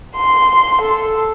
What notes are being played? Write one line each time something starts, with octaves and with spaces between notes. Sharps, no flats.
C6
A4